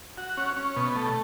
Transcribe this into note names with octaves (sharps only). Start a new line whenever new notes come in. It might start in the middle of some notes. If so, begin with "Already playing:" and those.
F#4
C#4
C#4
B2
A3